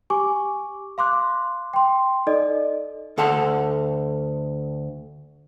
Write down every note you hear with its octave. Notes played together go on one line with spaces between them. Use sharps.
G4 G#5 C#6 D6
F5 C6 D6 F#6
G5 C6
D#4 A4 D5 D#5
D2 A4 F#5 A5 C6